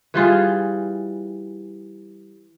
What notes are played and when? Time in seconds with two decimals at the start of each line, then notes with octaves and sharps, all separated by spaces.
0.14 E3 G3 F4 G#4